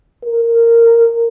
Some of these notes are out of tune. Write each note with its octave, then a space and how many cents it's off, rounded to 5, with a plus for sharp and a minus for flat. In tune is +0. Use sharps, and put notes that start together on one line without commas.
A#4 -10